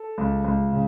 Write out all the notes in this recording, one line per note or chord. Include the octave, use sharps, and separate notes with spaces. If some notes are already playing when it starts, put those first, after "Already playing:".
Already playing: A4
C#2
C#2
C#3